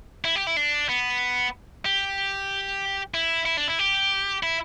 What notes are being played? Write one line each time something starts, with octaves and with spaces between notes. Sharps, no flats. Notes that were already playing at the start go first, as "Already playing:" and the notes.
E4
G4
E4
D4
B3
G4
E4
E4
D4
E4
G4
E4